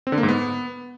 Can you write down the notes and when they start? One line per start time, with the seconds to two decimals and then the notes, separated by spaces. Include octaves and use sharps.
0.07 C4
0.12 D3
0.18 A#3
0.23 G#2
0.28 B3